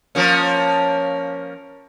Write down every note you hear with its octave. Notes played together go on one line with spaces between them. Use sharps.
F3 A#3 C#4